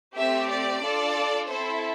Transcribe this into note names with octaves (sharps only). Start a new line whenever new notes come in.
A3 C4 G4 E5
D5
D4 F4 A4
C4 E4 A4 C5